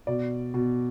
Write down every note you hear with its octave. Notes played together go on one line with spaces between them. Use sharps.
B2 D5
B2